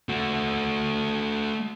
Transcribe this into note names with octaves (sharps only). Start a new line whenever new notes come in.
A3 F#4